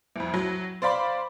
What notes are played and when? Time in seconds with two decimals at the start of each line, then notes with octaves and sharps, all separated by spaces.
0.16 C2 F2
0.34 F#3
0.82 C5 D5 F5 B5 C6 D6